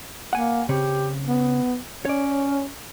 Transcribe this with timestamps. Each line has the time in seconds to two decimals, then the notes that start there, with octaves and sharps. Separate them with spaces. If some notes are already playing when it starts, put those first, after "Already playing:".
0.33 A#3 F#5 G#5
0.69 C#3 C4 C#4 G4
1.27 B3
2.05 C#4 C#5 D5